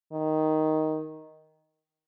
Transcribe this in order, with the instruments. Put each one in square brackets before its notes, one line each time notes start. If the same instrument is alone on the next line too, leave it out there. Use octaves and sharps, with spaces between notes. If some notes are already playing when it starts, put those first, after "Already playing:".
[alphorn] D#3